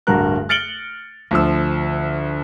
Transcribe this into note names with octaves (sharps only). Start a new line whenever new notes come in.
D1 G2 F#4 A#4 F#6
F6 A6 C#7 D7 F#7 G7
D2 F3 E6